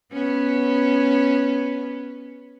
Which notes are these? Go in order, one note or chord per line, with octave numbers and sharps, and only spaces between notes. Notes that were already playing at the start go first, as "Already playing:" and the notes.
B3 C#4